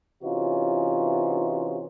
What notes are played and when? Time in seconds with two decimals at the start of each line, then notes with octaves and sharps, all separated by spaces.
0.23 C3 E3 C#4 D#4 F4 F#4